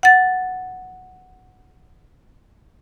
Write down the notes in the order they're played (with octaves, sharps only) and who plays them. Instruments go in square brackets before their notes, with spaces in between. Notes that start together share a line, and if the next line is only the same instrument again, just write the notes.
[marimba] F#5 A6